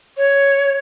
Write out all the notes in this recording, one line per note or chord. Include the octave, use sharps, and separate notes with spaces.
C#5